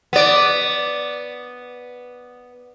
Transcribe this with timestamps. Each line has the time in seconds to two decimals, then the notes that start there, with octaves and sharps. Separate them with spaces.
0.13 B3 D5